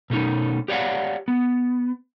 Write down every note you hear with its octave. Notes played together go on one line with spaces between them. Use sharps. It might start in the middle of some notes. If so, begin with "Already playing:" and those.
B2 A3 C#4 D#4
G4 C#5 D5 F5 F#5
B3